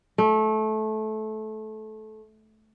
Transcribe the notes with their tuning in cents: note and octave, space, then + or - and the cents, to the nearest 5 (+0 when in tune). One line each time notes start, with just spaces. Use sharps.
A3 -20